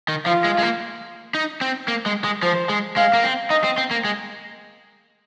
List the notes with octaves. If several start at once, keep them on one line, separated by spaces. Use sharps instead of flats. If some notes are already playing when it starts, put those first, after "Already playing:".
D#3
F3 F4
G#3
G#3
A#3
D#4
C4
A#3
G#3
G#3
F3 C5
G#3
G#3 F5
A#3
C4
D#4 D#5
C4
C4
A#3
G#3